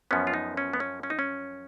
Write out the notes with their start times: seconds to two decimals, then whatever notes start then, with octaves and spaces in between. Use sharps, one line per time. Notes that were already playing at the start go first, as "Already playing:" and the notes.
0.11 F#2 F3 B3 C#4
0.27 F4
0.34 D#4
0.57 C#4
0.73 B3
0.80 C#4
1.03 C#4
1.10 D#4
1.19 C#4